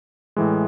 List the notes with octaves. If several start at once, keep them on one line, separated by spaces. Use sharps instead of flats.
A2 E3 G#3